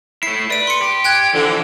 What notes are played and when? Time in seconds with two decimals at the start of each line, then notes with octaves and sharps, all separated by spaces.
0.23 A3 E4 C7
0.50 B4 D5 D7
0.67 C6 C#7
0.82 G4
1.04 G5 F#6 G#6
1.34 D3 E3 F3